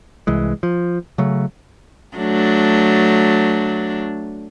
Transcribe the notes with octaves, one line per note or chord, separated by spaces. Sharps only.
C2 E3 G#3
F3
C#3 F#3 A3
F#3 A3 D4